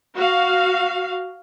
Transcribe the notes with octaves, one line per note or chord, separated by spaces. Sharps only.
F#4 F5